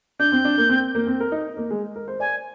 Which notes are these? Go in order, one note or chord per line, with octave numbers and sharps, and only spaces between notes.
D4 G6
C4
D4
A#3
C4
A#3
C4
A#4
D#4
A#3
G#3
A#4
C5
D5 G#5